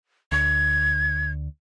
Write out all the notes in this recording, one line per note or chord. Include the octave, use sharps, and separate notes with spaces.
D2 G#6